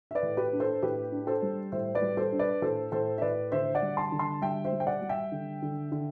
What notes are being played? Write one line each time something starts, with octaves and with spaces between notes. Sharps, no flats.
E5
B4 D5
A2
G4 B4
D4
A4 C5
A2 G4 B4
D4
A4 C5
G3
A2 C5 E5
B4 D5
G3
A4 C5
D4
B4 D5
A2 A4 C5
A2 A4 C5
E5
A2 B4 D5
D3 C5 E5
D5 F#5
G3
A5 C6
D3
A5 C6
G3 E5 G5
C5 E5
G3
G5
D5 F#5
G3
E5 G5
D3
D3
D3